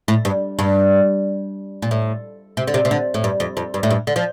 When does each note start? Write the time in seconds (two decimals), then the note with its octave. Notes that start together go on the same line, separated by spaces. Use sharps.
0.08 A2
0.25 G2
0.59 G2
1.82 A#2
1.91 A2
2.57 C3
2.67 D3
2.74 C3
2.85 C3
2.91 D3
3.14 A2
3.24 G2
3.40 F2
3.57 F2
3.74 G2
3.83 A2
3.91 G2
4.07 D3
4.16 F3